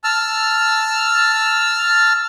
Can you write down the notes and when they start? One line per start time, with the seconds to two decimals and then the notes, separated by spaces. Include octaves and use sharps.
0.04 A5 E6 F6